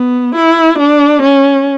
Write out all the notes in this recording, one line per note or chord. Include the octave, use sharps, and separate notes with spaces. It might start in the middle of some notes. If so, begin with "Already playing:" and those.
Already playing: B3
E4
D4
C#4